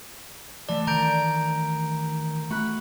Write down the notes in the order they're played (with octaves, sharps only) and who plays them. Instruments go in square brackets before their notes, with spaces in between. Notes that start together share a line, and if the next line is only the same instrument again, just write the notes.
[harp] E3 A3 [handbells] D5
[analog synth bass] D#3 [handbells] A#5 G6 D7
[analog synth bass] A3 [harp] F#4 B5 F#6